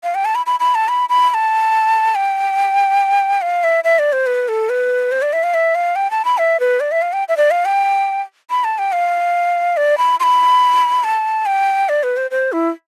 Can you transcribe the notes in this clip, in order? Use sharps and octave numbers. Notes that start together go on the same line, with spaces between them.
F5
G5
A5
B5
B5
B5
A5
B5
B5
B5
A5
G5
F5
E5
E5
D5
C5
B4
A4
B4
C5
D5
E5
F5
E5
F5
G5
A5
B5
E5
B4
D5
E5
F5
G5
E5
D5
F5
G5
B5
A5
G5
F5
D5
B5
C6
B5
A5
G5
D5
B4
C5
C5
E4